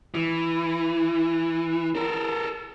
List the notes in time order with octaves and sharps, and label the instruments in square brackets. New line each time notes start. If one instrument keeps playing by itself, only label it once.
[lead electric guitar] E3
A4 A#4